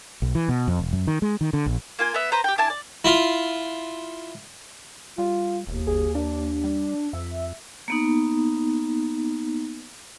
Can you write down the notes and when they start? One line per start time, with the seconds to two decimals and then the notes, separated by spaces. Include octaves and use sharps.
0.22 B1
0.35 E3
0.49 B2
0.68 F2
0.79 E1
0.93 F#2
1.07 D#3
1.22 G#3
1.41 D#3
1.53 D3
1.66 A#1
1.99 A#3 F4 G#5
2.14 B3 E5
2.32 B4 C5 A#5
2.44 G4 G5
2.58 D4 E4 G#5 A5
2.70 D5
3.05 E4 F4
5.18 G3 F4
5.67 E1 D#2
5.87 G1 G#4
6.15 A#3 D4
6.64 G3
7.13 F2 E5
7.88 A#3 B3 D#4